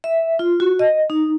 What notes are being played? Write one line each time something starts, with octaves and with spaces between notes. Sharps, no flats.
E5
F4
F#4
D#5
D#4